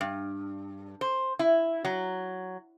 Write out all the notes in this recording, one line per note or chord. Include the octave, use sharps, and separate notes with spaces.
G2
C5
E4
F#3